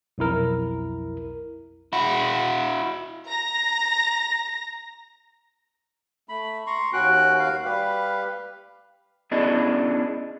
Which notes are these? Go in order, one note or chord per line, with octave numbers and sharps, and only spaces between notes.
B1 F2 E4 A#4
E4 F#4
A#5 A#6
A3 B5
A#5 C6 C#6
D#2 C#4 F#4 B4 G5 F#6
F5
G3 G4 B4 F5
B3 C#4 D4 E4 G#4 D#5